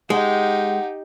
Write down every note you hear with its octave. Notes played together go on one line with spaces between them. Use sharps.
G#3 D#4 G4 F#5